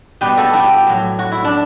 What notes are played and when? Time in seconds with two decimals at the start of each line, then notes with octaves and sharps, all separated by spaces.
0.21 B2 G3 G4 B4
0.37 F#4 A4
0.54 E4 G4
0.87 A2 F#3
1.19 F#4
1.32 E4
1.44 D4